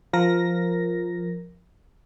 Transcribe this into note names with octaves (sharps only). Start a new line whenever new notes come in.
F3 A#4 A#6